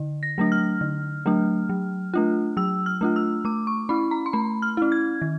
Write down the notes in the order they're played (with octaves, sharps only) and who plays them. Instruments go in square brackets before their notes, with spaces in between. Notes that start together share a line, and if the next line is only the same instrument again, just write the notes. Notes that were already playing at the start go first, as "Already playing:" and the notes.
Already playing: [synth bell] D3
A#6
F#3 A3 D4
F6
D3
F#3 A3 D4
F#3
A3 D4 F4
F#3 E6
F6
A3 D4 F4
E6
A3 D6
C#6
C#4 E4 B5
A#5
C6
A3 B5
F6
C#4 E4
G#6
D#3